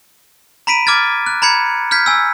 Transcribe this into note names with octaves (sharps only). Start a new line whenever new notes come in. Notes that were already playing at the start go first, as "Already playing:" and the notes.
A#5 B5 B6 D7 D#7
D6 F6 G#6 A6
F#6
A#5 B5 G#6 C#7
F6 G6 G#6 B6
G#5 E6